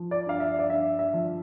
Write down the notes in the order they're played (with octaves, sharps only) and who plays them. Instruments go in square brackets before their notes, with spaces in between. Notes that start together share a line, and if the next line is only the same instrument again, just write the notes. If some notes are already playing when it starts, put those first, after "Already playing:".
Already playing: [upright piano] F3
D5
G2 F5
E5
D5
G2 E5
E5
F3